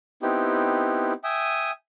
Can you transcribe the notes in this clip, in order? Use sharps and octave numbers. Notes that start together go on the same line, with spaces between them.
B3 C4 D#4 E4 G4
E5 G5 G#5 D#6